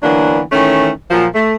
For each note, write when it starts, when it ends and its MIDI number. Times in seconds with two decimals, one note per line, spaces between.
0.03 0.41 50
0.03 0.41 52
0.03 0.41 54
0.03 0.41 58
0.03 0.41 59
0.03 0.41 62
0.52 0.89 51
0.52 0.89 52
0.52 0.89 57
0.52 0.89 61
1.11 1.25 46
1.11 1.25 53
1.11 1.25 54
1.34 1.54 57